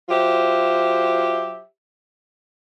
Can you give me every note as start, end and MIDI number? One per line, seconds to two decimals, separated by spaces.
0.09 1.61 54
0.09 1.61 65
0.09 1.61 67
0.09 1.61 72
0.09 1.61 76